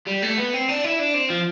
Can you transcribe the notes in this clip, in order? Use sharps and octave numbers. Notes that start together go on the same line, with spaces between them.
G3
A3
B3
C4
D4
E4
D4
C4
F3